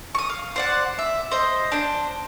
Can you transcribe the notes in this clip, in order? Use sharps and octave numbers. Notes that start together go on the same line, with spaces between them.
C#6 D#6
F5
C5 D5 F#5
E5
C5 D#5
D4 C5